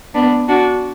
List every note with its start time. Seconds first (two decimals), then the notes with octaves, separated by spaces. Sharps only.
0.14 B3 D4
0.48 D4 F#4